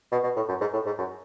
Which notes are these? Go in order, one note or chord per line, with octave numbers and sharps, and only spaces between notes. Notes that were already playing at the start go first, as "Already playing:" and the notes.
B2
B2
A2
F#2
G#2
A2
G#2
F#2